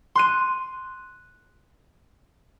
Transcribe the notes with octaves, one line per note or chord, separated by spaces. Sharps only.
C6 F#6 D#7